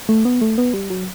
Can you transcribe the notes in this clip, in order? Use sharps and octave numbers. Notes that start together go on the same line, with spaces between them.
A3
B3
A3
B3
G3
F#3